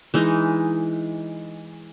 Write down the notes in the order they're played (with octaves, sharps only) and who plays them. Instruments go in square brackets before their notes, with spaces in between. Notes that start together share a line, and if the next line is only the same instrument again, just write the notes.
[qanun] E3 G#3 D#4